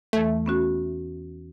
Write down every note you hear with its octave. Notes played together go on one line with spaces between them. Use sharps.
E2 E3 A3
B3 C#4 F#4